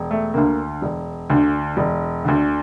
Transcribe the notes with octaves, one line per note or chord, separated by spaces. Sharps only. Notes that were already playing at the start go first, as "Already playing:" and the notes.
Already playing: E1
A3
D2 D3 A#3
E1
D2 D3
E1
D2 D3